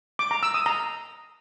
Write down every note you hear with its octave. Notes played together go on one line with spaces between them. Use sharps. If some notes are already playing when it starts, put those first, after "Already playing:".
D6
A#5
E6
D#6
A#5